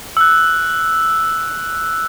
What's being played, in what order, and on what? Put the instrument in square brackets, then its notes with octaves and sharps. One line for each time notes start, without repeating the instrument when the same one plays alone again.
[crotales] E6 F#6